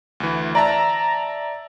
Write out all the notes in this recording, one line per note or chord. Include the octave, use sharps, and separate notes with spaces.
D2 E3
D5 E5 A5 A#5